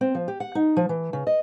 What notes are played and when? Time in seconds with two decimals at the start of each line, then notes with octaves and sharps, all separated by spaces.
0.01 C4
0.15 F3
0.28 G4
0.40 F#5
0.55 D#4
0.77 F3
0.89 E3
1.13 C#3
1.27 D#5